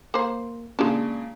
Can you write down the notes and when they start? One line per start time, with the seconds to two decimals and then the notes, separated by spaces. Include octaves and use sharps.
0.14 A#3 C5
0.79 A#2 C#3 G#3 D4